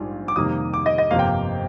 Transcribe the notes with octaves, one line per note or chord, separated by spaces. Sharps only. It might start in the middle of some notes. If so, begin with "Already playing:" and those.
Already playing: A#1 G#2 G3 D4 F4
D6
F2 C3 D#3 G3 A#3 D#6
D6
D#5
D#5
G1 F2 C3 F3 A#3 F5
G5
F5